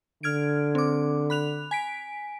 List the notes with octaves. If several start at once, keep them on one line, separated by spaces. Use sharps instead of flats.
D3 F6 G#6 D7
C4 D6
B5 F#6 F7
G#5 B6 D7